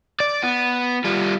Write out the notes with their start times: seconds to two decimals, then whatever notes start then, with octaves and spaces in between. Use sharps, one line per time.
0.20 D5
0.43 B3
1.04 G3 F4